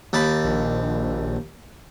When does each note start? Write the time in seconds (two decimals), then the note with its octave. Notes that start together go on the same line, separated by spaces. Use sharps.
0.13 D#2 A5 B5
0.44 A#1